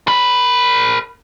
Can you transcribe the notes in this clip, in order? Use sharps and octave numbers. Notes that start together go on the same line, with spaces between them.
A#4 B5